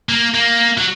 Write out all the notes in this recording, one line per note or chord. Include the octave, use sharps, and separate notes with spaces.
A#3
A#3
F#3